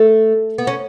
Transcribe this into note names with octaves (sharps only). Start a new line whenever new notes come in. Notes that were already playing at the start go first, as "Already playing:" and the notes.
Already playing: A3
B3
C#4